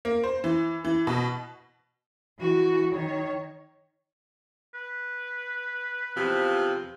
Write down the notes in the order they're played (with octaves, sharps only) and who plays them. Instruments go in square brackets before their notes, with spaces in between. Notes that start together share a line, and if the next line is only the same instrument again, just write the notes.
[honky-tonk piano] A#3
C5
E3
E3
B2
[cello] E3 F#4
D#3 C#5
[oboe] B4
[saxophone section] E2 C3 F3